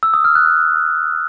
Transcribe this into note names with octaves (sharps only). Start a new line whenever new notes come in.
E6
D#6
F6
F#6